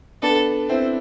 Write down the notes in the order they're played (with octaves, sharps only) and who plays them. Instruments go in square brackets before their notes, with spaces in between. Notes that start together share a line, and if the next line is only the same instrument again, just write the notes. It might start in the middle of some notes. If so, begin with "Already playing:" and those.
[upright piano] B3 D4 [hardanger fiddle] A4
[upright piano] C4 E4 [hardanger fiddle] C5